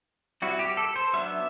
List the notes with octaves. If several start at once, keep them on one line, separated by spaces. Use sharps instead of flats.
G3 C4 E4 F#4
G4
A4
C5
F#3 B3 D4 E5